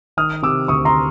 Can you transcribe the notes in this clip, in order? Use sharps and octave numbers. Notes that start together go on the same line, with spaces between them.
D#3 D#6 F6
C3 D6 E6
D2 C#6 D#6
A#5 C6